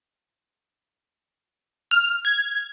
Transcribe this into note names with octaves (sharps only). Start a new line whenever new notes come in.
F6
G#6